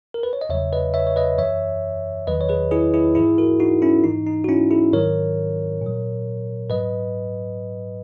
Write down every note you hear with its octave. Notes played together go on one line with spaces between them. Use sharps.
A#4
B4
C#5
D#5
E2 C#3 F#3 C#5 E5
B4 D#5
C#5 E5
C#5
B4 D#5
F#2 E3 C#5 E5
E2 D#3 F#3 B4 D#5
C#5
G#4 B4
E4 G#4
E4 G#4
G#2 E3 E4 G#4
F#4 A#4
D#4 F#4
C#4 E4
G#2 E3 D#4
D#4
F#4
C#4 E4
E4 G#4
G#2 D#3 F#3 A#4 C#5
A#2 F#3
G#2 F#3 B4 D#5